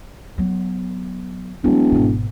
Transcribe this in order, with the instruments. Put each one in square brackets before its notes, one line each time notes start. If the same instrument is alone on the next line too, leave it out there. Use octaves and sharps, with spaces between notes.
[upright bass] F#3 B3
[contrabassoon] E1 [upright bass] F#3 A3
[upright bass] G#1 B2